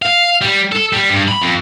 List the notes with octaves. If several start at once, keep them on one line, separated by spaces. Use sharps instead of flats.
F5
G3
A4
G3
G2
B5
F2